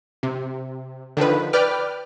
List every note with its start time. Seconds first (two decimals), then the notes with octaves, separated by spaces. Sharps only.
0.23 C3
1.17 D3 D#3 F3 B4
1.53 B4 D5 G5 D6 F6